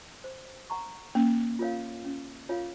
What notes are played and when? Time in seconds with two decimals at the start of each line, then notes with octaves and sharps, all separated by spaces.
0.24 C5
0.70 F#5 A#5 C#6
1.15 A#3 C#4
1.59 F4 A#4 C#5 F5
2.05 C#4
2.49 F4 A#4 C#5 F5